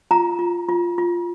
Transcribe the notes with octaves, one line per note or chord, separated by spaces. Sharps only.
F4 A#5
F4
F4
F4